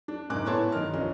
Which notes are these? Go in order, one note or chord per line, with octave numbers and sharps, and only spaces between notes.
D4
F#1 G#2 G#5 D6 F#6
A2 B3 E4 C#5 A5 C6
G2 D#3 D#4 A#4 F6
C2 F3 C#4 D#5